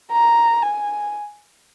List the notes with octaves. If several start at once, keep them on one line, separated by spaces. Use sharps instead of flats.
A#5
G#5